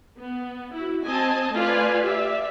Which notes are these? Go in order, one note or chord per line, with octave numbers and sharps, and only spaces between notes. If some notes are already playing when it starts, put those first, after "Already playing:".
B3
E4 F#4
C4 D#5 G#5 A5
A3 F4 B4 D5 G#5
G4 D5 E5 F5